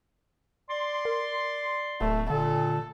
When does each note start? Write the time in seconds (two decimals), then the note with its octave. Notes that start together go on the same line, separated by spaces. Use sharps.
0.70 D5 C6
1.05 A#4
2.01 D1 A3
2.30 A#2 D3 A4